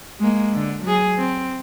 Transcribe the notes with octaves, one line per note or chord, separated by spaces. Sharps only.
G#3 A#3
D3
F#3 G#4
C4